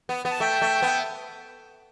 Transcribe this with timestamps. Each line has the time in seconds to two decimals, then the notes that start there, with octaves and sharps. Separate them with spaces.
0.09 B3
0.25 B3
0.31 A5
0.40 A3 E5 G5
0.62 A3
0.82 B3